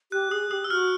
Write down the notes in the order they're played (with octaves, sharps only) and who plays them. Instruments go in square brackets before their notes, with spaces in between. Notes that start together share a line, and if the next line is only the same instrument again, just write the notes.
[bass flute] G4 [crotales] F#6
[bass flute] G#4 [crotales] D#6
[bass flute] G4 [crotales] D#6
[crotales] E6
[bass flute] F#4 [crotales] F6